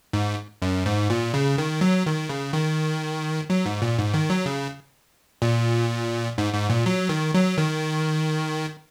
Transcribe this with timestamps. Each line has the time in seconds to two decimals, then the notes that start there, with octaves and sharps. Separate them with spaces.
0.13 G#2
0.62 F#2
0.86 G#2
1.10 A#2
1.34 C#3
1.58 D#3
1.81 F#3
2.06 D#3
2.29 C#3
2.53 D#3
3.50 F#3
3.66 G#2
3.82 A#2
3.98 G#2
4.14 D#3
4.30 F#3
4.46 C#3
5.42 A#2
6.38 G#2
6.53 G#2
6.70 A#2
6.86 F#3
7.09 D#3
7.34 F#3
7.57 D#3